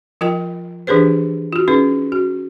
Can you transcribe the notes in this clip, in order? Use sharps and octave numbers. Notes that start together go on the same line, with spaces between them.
F3 F4 A#4 D#5 G5
E3 D4 G4 G#4 B4 C5
F4 F#4
C#4 D#4 G#4 B4
F#4